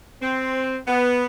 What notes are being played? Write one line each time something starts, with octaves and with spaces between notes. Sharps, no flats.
C4
B3